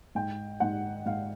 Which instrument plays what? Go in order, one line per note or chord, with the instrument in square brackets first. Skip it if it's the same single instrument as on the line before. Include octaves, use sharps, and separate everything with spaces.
[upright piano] G#2 G5
G#2 F#5
G#2 F5